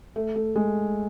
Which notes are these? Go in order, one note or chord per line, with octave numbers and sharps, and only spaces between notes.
A3
A3
G#3